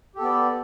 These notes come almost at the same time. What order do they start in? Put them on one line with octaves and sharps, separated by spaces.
G4 A4 B3 D5